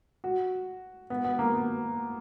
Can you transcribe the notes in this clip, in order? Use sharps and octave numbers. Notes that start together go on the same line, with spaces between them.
F#4
B3
B3
A#3
B3